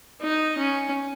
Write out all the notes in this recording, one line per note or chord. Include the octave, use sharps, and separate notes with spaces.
D#4
C#4